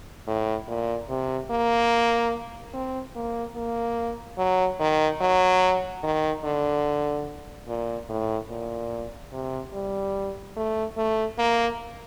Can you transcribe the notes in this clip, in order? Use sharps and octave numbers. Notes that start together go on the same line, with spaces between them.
A2
A#2
C3
A#3
C4
A#3
A#3
F#3
D#3
F#3
D#3
D3
A#2
A2
A#2
C3
G3
A3
A3
A#3